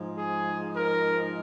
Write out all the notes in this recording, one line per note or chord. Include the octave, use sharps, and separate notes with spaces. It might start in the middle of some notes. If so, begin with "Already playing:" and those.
Already playing: G#2 F3
G#4
A#4